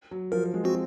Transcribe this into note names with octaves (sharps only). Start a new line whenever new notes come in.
F#3
F3 A#4
G#3
C4 F#4